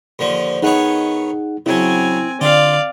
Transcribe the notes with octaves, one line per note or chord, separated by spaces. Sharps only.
D#2 D3 F3
D#3 B3 D#4 G#4 C#5 F#5
C#3 F#3 C4 E4 G#5
D3 F4 D5 F5